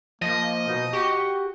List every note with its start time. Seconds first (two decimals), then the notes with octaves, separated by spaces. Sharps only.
0.22 F3 A#3 D#5
0.68 B2 D#4
0.93 F#4 G4 C#6